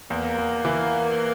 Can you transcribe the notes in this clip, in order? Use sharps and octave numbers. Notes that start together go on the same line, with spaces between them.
E2 A#3
E2
E3